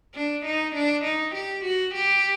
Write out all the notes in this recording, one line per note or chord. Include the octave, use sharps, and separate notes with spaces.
D4
D#4
D4
D#4
G4
F#4
G4